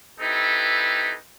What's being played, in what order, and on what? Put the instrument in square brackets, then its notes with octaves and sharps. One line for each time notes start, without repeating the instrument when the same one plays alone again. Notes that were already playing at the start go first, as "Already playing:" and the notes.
[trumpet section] C4 D#4 E4 G4 A4 B4